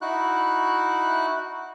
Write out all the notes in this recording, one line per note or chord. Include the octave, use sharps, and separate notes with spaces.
D#4 E4 F#4 F#6